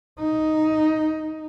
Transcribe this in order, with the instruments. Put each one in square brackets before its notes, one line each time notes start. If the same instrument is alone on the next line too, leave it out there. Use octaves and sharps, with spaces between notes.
[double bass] D#4